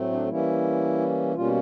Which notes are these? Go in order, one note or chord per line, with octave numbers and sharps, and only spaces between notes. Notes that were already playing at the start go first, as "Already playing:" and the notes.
Already playing: A2 F#3 A3 C4
D4
E3 G3 A#3 C#4 E4
B2 G3 A#3 C#4 F4